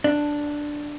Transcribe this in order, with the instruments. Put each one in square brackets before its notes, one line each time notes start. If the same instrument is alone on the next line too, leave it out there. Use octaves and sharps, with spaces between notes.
[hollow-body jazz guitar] D4